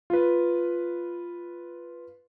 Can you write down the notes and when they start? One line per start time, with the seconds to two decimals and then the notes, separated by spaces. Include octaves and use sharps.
0.10 F4 B4